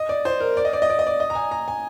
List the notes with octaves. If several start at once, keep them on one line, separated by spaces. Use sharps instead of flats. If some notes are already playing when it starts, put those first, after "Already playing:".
Already playing: D#5
D5
C5
A#4
D5
D#5
D5
D#5
D5
D#5
D5
D#5
A#5
G#5
A#5
G#5